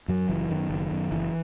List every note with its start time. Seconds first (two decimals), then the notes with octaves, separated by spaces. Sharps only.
0.08 F#2 F#3
0.29 F#1 E3
0.50 F#2 D#3
0.70 F#1
0.91 F#2
1.12 F#1 E3